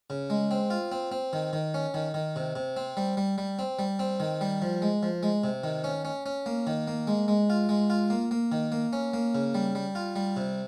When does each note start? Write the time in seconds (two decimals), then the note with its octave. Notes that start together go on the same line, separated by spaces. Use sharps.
0.10 C#3
0.30 G#3
0.51 C4
0.70 F4
0.92 C4
1.11 C4
1.33 D#3
1.53 D#3
1.74 C#4
1.94 D#3
2.14 D#3
2.36 C3
2.56 C3
2.76 C4
2.97 G3
3.17 G3
3.38 G3
3.59 C4
3.79 G3
3.99 C4
4.20 D#3
4.41 G3
4.62 F3
4.82 G#3
5.03 F3
5.23 G#3
5.44 C3
5.64 D#3
5.84 C#4
6.05 C#4
6.26 C#4
6.46 A#3
6.67 D#3
6.87 A#3
7.07 G#3
7.28 G#3
7.50 F4
7.69 G#3
7.90 F4
8.10 A#3
8.31 A#3
8.52 D#3
8.72 A#3
8.93 C#4
9.13 A#3
9.35 C#3
9.54 G3
9.75 G3
9.95 F4
10.16 G3
10.36 C3